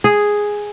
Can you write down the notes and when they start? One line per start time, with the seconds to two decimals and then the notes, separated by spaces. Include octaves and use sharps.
0.04 G#4